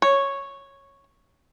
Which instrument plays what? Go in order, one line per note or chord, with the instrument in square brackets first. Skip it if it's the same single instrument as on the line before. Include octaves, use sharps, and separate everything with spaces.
[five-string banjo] C#5